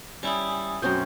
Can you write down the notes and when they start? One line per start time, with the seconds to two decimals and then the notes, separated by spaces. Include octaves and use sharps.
0.23 G3 C#4 E4 G#5 B5 D#6
0.82 F#2 B2 A3 C4 C#4 G6